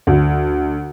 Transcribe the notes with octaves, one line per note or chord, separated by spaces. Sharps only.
D2